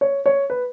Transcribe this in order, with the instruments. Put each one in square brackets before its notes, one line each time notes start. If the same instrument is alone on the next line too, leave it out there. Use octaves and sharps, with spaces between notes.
[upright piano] C#5
C#5
B4